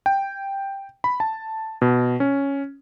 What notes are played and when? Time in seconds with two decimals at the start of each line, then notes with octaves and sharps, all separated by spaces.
0.06 G5
1.04 B5
1.20 A5
1.82 B2
2.20 C#4